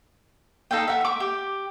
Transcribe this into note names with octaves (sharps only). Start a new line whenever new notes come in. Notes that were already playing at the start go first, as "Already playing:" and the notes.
D#4 A4 F5 G5
E5 F#5
E5 D6
G4